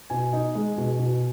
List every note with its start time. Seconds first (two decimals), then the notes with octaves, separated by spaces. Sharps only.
0.10 B2 G#5
0.33 D#4
0.55 G#3
0.78 B2
0.99 B2